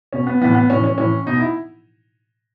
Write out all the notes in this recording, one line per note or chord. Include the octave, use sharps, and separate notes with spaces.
B2 C#4
B3
A2 E3 B3
B3
A2 E3 C#4
C#4
A2 E3 C#4
B2 D#4
E4